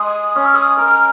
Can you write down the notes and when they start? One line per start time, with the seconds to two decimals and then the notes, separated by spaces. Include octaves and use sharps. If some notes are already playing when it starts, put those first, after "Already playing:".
Already playing: G#3 D#6
0.35 C#4 D#6
0.45 F6
0.55 D#6
0.78 A#4 F6